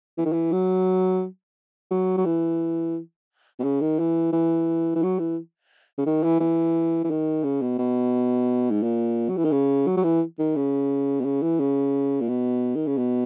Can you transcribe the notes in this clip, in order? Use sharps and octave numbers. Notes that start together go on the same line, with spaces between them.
E3
D#3
E3
F#3
F#3
F#3
E3
B2
C#3
D#3
E3
E3
E3
F#3
E3
C#3
D#3
E3
E3
E3
D#3
C#3
B2
B2
G#2
A#2
F#3
E3
D#3
C#3
F#3
F#3
E3
D#3
C#3
B2
C#3
E3
C#3
A#2
B2
D#3
C#3
B2